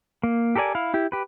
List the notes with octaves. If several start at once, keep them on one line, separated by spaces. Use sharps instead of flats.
A#3
G4 A4 A#4 D5 G#5
E4 F5
E4 G4
G4 B4